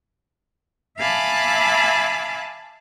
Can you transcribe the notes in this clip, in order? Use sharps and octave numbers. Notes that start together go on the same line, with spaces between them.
E5 F5 G#5 A5 B5 D6